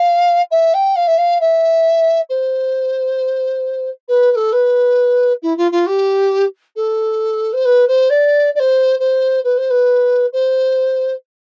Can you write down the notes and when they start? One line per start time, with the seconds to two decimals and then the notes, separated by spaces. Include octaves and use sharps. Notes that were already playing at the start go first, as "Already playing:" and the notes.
Already playing: F5
0.50 E5
0.74 G5
0.95 F5
1.07 E5
1.17 F5
1.40 E5
2.29 C5
4.08 B4
4.31 B4
4.35 A4
4.52 B4
5.42 E4
5.57 F4
5.71 F4
5.86 G4
6.75 A4
7.53 C5
7.64 B4
7.87 C5
8.09 D5
8.55 D5
8.59 C5
8.99 C5
9.44 B4
9.57 C5
9.70 B4
10.32 C5